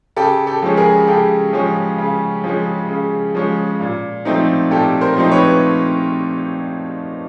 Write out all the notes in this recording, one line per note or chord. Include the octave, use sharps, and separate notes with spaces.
C#3 G4 A4
G4 A4
F3 G#3 C#4
G#4 A#4
C#3 G4 A4
F3 G#3 C#4
C#3
F3 G#3 C#4
C#3
F3 G#3 C#4
A#2
F3 A3 C4 D#4
A#2 G4 A4
A#4 C5
F3 A3 C4 D#4
B4 C#5